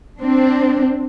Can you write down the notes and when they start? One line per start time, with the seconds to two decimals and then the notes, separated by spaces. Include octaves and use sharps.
0.19 C4 D4